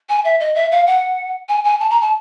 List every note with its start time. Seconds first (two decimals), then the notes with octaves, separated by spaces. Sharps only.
0.09 G#5
0.24 E5
0.40 D#5
0.55 E5
0.71 F5
0.87 F#5
1.49 G#5
1.64 G#5
1.80 A5
1.90 A#5
2.01 A5